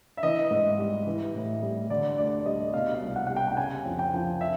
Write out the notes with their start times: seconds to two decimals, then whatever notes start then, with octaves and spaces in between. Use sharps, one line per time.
0.17 E5
0.23 E3 D#5
0.51 G#2
0.79 G3
1.07 E3
1.34 A2
1.63 G3
1.90 D3 D5
2.18 D2 D5
2.46 G3 D#5
2.74 B2 F5
2.95 F5
3.02 C2
3.16 F#5
3.27 G3 F#5
3.36 G5
3.48 G5
3.57 C#3 G#5
3.85 F2
3.99 G5
4.14 F3
4.41 E5